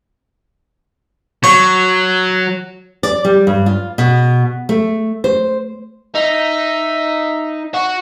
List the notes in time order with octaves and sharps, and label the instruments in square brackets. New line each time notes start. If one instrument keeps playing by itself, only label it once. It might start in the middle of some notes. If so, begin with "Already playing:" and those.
[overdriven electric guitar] F#3 [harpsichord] C#5
[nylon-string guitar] D5
G3
G2
F4
B2
A3
C5
[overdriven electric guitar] D#4 [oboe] E5
[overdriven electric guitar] F#4